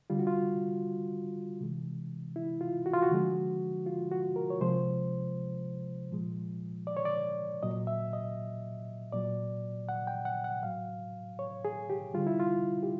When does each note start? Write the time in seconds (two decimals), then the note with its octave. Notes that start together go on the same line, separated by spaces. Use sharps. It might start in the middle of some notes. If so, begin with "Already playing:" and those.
0.10 D3 G3 F4
0.19 F#4
0.27 F4
1.60 C3 E3 G#3
2.36 E4
2.61 F4
2.86 F#4
2.94 F4
3.02 F#4
3.11 D3 F3 G#3
3.87 F4
4.11 F#4
4.36 A#4
4.50 C#5
4.61 C3 F3 G#3 C5
6.12 A#2 F3 G#3
6.87 D5
6.97 C#5
7.05 D5
7.63 A#2 F#3 D#5
7.87 E5
8.13 D#5
9.12 A#2 F#3 D5
9.89 F#5
10.07 G5
10.25 F#5
10.44 F#5
10.63 A2 F#3 F5
11.39 C#5
11.65 G#4
11.90 G4
12.14 D3 G3 F4
12.27 E4
12.40 F4
12.83 G4